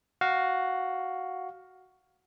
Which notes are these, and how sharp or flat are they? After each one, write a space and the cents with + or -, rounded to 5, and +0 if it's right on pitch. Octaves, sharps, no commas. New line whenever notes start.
F#4 +5 F5 +10